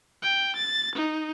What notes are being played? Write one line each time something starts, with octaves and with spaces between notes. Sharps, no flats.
G5
A6
D#4